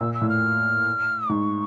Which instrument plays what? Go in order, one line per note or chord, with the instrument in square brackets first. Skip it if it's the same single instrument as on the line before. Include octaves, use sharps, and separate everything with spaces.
[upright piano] A#2 [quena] E6
[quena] E6
[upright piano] A2
[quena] F6
[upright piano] G#2 [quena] C#6